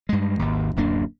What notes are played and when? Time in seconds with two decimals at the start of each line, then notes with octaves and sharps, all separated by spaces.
0.09 G2 G#3
0.39 G#1 D#2
0.76 D1 F#2 A#3 D4